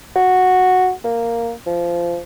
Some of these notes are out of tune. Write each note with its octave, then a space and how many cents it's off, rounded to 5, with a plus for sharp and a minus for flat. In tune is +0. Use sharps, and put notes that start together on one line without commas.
F#4 -5
A#3 -5
F3 -20